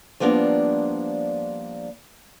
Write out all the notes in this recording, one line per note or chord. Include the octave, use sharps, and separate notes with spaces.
F3 G3 A#3 B3 D4